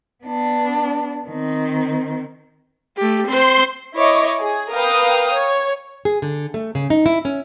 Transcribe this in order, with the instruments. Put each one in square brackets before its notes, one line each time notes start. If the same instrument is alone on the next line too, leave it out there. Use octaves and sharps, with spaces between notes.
[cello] B3 D4
D#3 C4
[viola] A3 G4
[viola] C4 C5 [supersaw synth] C6
[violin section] E4 C#5 D#5 C#6 D6
G#4
A#4 B4 F5 G5 D#6
C#5
[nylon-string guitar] G#4
D3
A3
C#3
D#4
E4
C#4